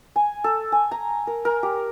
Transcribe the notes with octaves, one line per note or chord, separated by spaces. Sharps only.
G#5
A4
G#5
A#5
A#4
A#4
G4